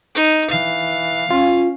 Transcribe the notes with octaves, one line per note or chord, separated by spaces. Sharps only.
D#4
E3 F5
C#4 F4